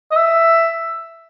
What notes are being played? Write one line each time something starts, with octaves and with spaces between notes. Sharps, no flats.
D#5
E5